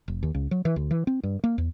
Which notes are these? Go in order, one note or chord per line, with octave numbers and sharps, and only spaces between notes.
F1
D#2
C#2
F#3
E3
D2
E3
C4
G2
A#3
E2